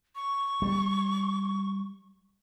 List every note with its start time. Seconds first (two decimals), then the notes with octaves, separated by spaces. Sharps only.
0.15 C#6
0.62 G3